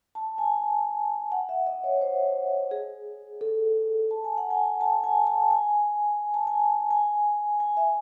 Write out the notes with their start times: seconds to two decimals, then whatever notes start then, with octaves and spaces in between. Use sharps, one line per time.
0.15 A5
0.38 G#5
1.32 F#5
1.49 E5
1.67 D#5
1.84 C#5
2.01 C5
2.71 G#4
3.41 A4
4.11 A5
4.24 G#5
4.38 F#5
4.50 G#5
4.81 A5
5.04 G#5
5.27 A5
5.51 G#5
6.34 A5
6.47 G#5
6.61 A5
6.91 G#5
7.60 G#5
7.77 E5